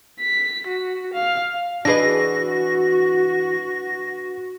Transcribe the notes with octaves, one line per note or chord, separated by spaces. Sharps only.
B6
F#4
F5
E3 D4 F#4 G#4 B4 D#5 A#6